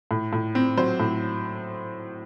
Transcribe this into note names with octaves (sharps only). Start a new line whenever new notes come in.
A2
A2
C4
F#3 C5
A2